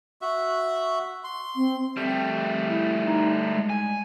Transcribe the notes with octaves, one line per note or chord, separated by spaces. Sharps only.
F#4 E5
C6
C4
G3 A3 C4
E4
D#4
G#3
G#5